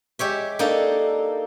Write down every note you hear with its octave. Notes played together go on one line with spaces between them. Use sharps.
G#3 G4 C#5 E5
A#3 D4 D#4 A4